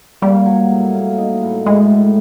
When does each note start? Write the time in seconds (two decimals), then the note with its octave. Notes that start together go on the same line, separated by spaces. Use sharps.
0.22 G3 A#3
0.46 F#3
0.71 A2
0.94 A#3
1.18 D#4
1.41 A2
1.66 A2 G#3
1.90 A2